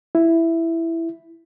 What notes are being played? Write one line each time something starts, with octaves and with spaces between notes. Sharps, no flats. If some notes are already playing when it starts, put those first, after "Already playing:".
E4